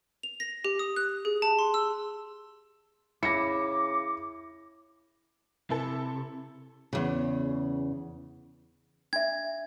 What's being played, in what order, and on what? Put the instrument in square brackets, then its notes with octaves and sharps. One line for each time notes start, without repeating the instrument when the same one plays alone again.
[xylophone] F7
A#6
G4
D#6
F#6
G#4
A5
C6
E6
[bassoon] C#3 [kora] E4 [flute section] D6 [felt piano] A#6 C#7
[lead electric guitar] C3 [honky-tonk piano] E4 A4
[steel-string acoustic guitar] E2 C#3
[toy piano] D4 E5 [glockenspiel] G#6